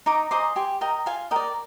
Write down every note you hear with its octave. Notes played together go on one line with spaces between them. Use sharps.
D#4 A#5 D6
G#4 C5 D#5 A#5 D6
G4 G#5 C6
A#4 D#5 G5 A#5
F4 F5 G#5
A#4 D5 D#5 G5